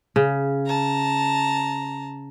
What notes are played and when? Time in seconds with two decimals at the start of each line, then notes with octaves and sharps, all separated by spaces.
0.16 C#3
0.66 A5 A#5